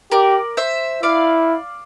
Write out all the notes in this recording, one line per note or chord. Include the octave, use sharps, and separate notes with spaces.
G4 A#4 D5
C5 E5
E4 D5 F5